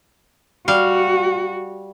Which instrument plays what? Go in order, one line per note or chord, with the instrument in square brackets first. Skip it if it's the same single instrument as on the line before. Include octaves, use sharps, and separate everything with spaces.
[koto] G3 F5 [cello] F#4